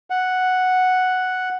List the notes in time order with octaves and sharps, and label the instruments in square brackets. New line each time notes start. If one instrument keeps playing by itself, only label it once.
[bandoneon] F#5